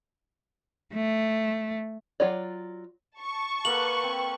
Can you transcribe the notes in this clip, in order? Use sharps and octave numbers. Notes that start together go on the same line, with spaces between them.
A3
F#3 F4 C#5 D5
A5 C#6
A#3 A4 B4 F#5 F#7
C4